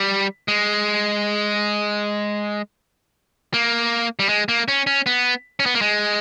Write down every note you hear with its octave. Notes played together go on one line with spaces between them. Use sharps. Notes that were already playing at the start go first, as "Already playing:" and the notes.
Already playing: G3
G#3
A#3
G3
G#3
A#3
C#4
C#4
B3
C#4
B3
A#3
G#3